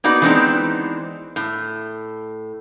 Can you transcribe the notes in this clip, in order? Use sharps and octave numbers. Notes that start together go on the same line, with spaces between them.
A#3 B3 D#4 F#4 D5
E3 G#3 B3 C4 D4 D#4
A2